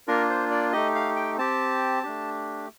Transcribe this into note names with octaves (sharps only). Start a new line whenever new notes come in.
A#3 D4 F4 A#4
C5
D5
A3 D#4 G4 D#5
F5
G5
C4 G4 A5
A3 D4 G4